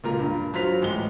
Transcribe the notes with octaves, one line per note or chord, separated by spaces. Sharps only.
C#2 A#2 F4 A#4 A#5
G2
F#3 F4 C5 B6 F7
A1 G#3 G7